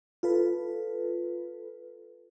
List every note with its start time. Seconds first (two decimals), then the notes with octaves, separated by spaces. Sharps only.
0.23 F4 A4 B4